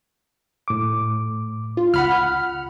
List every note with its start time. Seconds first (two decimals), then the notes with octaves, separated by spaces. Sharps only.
0.68 A2 D6
1.77 F4
1.94 C#2 F#5 B5 F6